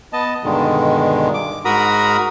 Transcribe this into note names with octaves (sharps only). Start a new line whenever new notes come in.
B3 D#5 A5
G2 B2 D3 D#3 G#3
D6
G#2 F#4 A#4 A#5 B5 D#6